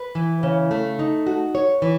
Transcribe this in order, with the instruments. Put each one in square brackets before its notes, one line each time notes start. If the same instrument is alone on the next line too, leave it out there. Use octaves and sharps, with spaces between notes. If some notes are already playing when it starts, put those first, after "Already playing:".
Already playing: [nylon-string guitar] B4
E3
C#3
A3
D#4
F#4
C#5
E3